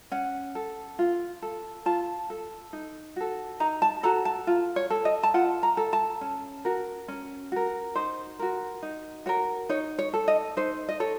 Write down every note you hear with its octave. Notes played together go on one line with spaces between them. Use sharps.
C#4 F#5
A4
F4
A4
F4 A5
A4
D#4
F#4 A4
D#4 A#5
A5
F#4 A4 A#5
A5
F4
C#5
A4
D#5
A5
F4 F#5
A#5
A4
A5
C#4
F#4 A#4
C#4
F#4 A#4
D#4 C5
F#4 A#4
D#4
F#4 A#4 C#5
D#4 C#5
C#5
A4
D#5
D#4 C5
D#5
A4 C#5